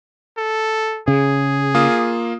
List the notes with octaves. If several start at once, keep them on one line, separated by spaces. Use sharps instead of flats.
A4
C#3 G#4
A#3 F4 D#6